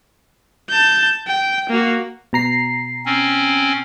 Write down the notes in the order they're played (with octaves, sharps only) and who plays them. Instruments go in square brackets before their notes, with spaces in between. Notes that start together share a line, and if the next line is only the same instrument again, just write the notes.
[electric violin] A5 G6
G5
A#3 F#4
[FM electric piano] B2 A#5 C7
[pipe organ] C4 C#4